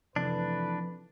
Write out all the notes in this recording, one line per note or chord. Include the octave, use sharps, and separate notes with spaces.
C3 E3 F3 A3 C4 D4 B4